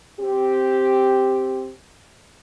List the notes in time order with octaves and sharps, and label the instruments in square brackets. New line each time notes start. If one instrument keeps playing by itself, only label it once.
[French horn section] C4 G4